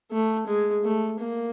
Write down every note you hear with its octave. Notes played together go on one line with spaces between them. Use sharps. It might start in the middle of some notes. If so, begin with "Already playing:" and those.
A3
G#3
A3
A#3